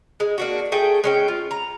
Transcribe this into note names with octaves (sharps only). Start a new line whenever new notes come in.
G#3
A#3 D4 F#4
A3 G#4 G5
G#3 C#4 G5
F4
A#5